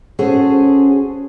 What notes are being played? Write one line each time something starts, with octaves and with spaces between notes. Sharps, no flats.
C#4 F#4 G#4 A4 C5